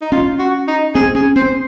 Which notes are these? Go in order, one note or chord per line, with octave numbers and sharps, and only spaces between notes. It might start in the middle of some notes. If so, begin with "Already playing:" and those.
D#4
C#4 F4
F#4
D#4
C4 G#4
C#4 G#4
C4 C5